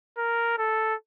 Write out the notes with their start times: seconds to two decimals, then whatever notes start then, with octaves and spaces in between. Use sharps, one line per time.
0.18 A#4
0.58 A4